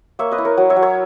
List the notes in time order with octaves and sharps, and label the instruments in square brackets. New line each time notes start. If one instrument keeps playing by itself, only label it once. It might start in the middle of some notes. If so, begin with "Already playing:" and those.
[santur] A#3 C#5 E5
B4 D#5
E4
A#4 C#5
F#3
C#5 E5
F#3
C#5 E5